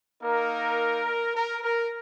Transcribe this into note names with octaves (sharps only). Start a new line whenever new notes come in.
A#3 D#4 A#4
A#4
A#4